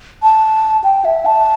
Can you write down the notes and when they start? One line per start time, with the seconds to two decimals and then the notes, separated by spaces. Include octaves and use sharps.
0.23 A5
0.84 G5
1.05 E5
1.26 A5